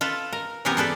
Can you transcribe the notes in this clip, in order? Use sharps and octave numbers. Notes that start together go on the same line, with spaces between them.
F4 A4 B4
A#4
C3 E3 B3 G4 A#4 G#5
G#4 A4 B4 D5